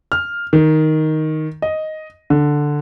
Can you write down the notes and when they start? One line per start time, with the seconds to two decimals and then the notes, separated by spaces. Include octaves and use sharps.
0.12 F6
0.53 D#3
1.62 D#5
2.30 D3